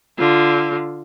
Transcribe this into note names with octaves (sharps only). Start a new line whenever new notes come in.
D3 F4